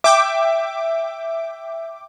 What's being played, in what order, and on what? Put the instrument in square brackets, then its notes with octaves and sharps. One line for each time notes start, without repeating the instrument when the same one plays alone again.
[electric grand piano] E5 [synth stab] G5 D6